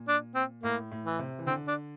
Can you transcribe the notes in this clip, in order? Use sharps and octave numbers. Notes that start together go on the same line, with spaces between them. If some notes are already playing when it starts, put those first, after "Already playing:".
Already playing: A#2
D4
C4
A2 A#3
A2
E3
C3
E3
D3 C4
D4